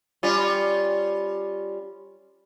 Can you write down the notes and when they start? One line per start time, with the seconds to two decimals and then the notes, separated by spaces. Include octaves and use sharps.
0.23 G3 C#4 F4